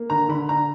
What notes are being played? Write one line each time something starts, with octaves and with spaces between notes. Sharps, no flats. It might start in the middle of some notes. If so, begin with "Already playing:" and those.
Already playing: A#3
D3 A#5
D3 B5
D3 A#5